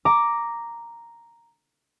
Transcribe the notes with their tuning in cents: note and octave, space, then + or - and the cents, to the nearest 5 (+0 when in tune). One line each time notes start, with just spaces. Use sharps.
A#5 +0 D6 +0